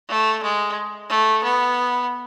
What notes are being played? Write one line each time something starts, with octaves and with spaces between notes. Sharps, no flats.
A3
G#3
A3
B3